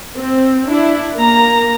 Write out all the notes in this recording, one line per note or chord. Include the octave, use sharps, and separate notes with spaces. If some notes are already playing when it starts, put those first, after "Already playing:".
C4
D4 E4
A#3 A#5